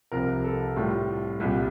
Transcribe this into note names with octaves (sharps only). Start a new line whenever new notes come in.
C2 C3 F3 A#4
A4
A2 G3 F4
C2 A#2 G3